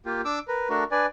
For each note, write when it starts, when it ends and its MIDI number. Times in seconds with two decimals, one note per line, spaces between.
0.06 0.21 58
0.06 0.21 65
0.06 0.21 67
0.25 0.39 62
0.25 0.39 86
0.25 0.39 88
0.48 0.69 70
0.48 0.69 71
0.70 0.84 57
0.70 0.84 62
0.70 0.84 66
0.70 0.84 70
0.91 1.06 62
0.91 1.06 71
0.91 1.06 74
0.91 1.06 80